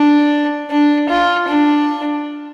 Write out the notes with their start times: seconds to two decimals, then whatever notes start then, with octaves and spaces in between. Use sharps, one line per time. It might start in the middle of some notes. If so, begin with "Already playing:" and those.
Already playing: D4
0.70 D4
1.09 F4
1.48 D4